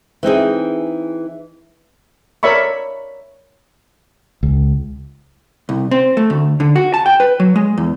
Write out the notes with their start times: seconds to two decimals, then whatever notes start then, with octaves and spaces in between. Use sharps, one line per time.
0.23 E3 C4 D#4 G#4
2.43 A#4 C#5 D5 E5 B5 C#6
4.43 C#2
5.69 C2
5.91 C4
6.17 A3
6.30 D2
6.60 D3
6.76 F#4
6.94 A5
7.06 G5
7.20 B4
7.40 F#3
7.56 G#3
7.78 E2